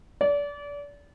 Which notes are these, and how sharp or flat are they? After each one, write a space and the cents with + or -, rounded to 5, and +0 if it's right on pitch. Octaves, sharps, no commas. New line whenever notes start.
D5 -30